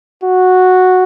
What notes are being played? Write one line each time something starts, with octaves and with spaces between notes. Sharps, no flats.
F#4